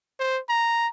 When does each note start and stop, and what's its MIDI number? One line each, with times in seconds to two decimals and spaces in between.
0.19 0.40 72
0.49 0.88 82